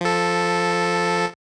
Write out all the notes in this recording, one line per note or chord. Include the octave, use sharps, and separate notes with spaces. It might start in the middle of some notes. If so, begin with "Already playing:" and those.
F3 A4